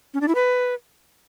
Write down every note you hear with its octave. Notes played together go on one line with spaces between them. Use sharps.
C#4
D4
E4
B4